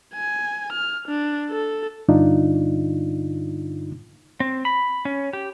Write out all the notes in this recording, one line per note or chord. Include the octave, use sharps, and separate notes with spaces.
G#5
F6
D4
A4
G2 D3 D4 D#4 F4
C4
B5
C#4
G4